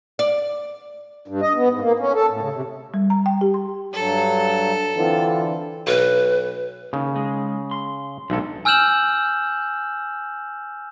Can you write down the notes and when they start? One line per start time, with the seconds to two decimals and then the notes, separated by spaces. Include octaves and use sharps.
0.19 D5
1.28 G2
1.42 D#5
1.55 B3
1.69 G#2
1.81 A#3
2.00 C#4
2.14 A4
2.29 A2
2.40 C#3
2.52 C3
2.94 G3
3.10 A#5
3.26 G5
3.41 G4
3.54 C6
3.93 G2 F#3 A4
4.96 D3 E3 C4 F4
5.87 B1 B4
6.93 D#2 C#3
7.16 G#3
7.71 C6
8.30 B1 D3 G3 G#3 A4
8.65 G#5 E6 F6 G6 E7 F#7